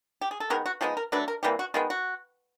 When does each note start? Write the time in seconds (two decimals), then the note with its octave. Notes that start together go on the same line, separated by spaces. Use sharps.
0.21 G4
0.31 G#4
0.40 A4
0.50 D#3 G#3 B3 A#4
0.66 F#4
0.81 F3 G#3 B3 D#4 G4
0.97 A#4
1.12 F#3 A3 D4 B4
1.28 A#4
1.43 C3 E3 G3 A#3 G4
1.59 F#4
1.74 D#3 G#3 B3 F4
1.90 F#4